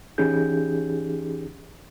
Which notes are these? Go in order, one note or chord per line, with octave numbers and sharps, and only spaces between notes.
E3 C#4 D#4 G4 G#4 G6